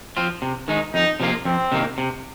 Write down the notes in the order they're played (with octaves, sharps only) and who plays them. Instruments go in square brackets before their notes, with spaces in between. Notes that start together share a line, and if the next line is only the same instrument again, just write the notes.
[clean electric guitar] F3 C4 F4
C3
D#3 G#3 D#4
[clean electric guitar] F2 [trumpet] D#4
[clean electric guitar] C3 F3 A#3 F4
[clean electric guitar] F2 [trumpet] C4
[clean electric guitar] C3 D#3 A#3
C3